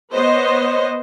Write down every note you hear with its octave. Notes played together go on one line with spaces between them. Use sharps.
B3 C5 C#5 D#5